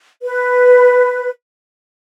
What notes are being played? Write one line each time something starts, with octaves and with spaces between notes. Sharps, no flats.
B4